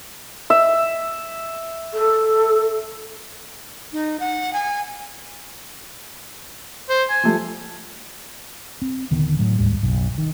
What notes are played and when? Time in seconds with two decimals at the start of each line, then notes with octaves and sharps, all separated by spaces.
0.50 E5
1.94 A4
3.93 D#4
4.20 F#5
4.53 G#5
6.89 C5
7.10 G#5
7.23 F3 G3 A3
8.82 C4
9.11 D#1 D3 D#3 B3
9.39 A2 F#3 A3
9.58 E1 D2 G#2 G3
9.83 F#1 B1
10.18 D#3